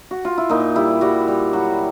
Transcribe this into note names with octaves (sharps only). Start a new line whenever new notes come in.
F#4
F4
E4
A#2 D#4
G3 E4
G3 F#4
G3
F#3 F#4